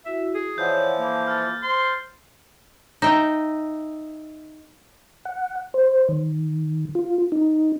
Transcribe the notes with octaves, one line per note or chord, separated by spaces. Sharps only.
E4 F#4 E5
G#4
E3 F3 C#5 D5 F#5 G6
A#3 A4 A5 B5
F6 A6
C5 C6
D#4 E5 G5
F#5
C5
D#3
F4
D#4